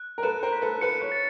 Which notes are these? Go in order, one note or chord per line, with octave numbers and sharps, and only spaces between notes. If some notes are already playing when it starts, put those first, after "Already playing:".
Already playing: F#6
A#4
A4 B4 E7
A#4 C5
B6
A4 B4
A4 B4 C#7
B4 C#5
A6